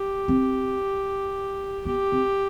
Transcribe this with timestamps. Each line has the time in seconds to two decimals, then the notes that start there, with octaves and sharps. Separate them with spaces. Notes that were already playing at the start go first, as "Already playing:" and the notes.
Already playing: G4
0.28 C4
1.85 B3 G4
2.12 C4